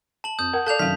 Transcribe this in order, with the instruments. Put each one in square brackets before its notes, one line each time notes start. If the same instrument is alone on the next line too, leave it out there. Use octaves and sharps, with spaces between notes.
[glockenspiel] A5 F#7
[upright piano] F2 [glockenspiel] D#6 G6
[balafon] A#4 [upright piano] F#5
[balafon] A4 D5 [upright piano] F5 D6 [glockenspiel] A5 G6 F7
[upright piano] F#2 C3 D#3 [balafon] F#3 F5 [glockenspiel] B6